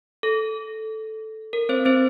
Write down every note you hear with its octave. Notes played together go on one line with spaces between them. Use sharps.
A4
A#4
C4 C5
C4 C5